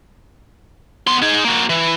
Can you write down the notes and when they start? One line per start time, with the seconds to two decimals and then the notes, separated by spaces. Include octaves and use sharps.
1.07 B2 C6
1.22 D#4 G#4
1.45 A#3 F#4
1.69 E3